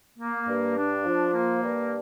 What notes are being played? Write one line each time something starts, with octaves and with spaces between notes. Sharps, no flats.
A#3
G2
D4
F3
A#3
G2